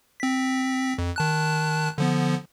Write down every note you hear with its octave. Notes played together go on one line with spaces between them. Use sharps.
C4 B6
F2
D#3 A5 F#6
D3 F3 B3